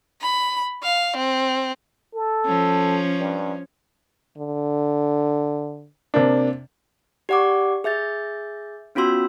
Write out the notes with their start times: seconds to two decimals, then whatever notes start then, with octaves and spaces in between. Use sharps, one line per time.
0.22 B5
0.84 F5
1.17 C4
2.14 A4
2.46 F3 C#4
3.19 G2
4.37 D3
6.14 C3 A#3 D4
7.29 G4 D5 F#5 C#6 D6
7.84 G#4 E5 G6 A6
8.95 B3 C#4 F4 F#4 C6 E6